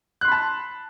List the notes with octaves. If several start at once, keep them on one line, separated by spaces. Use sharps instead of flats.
A5 B5 C6 F#6